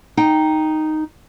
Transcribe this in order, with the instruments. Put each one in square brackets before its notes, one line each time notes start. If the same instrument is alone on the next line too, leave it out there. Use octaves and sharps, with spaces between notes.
[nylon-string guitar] D#4 G5